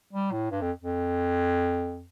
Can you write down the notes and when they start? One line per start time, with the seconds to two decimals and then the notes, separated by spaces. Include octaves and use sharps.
0.13 G3
0.32 A2
0.51 G2
0.61 F2
0.82 F2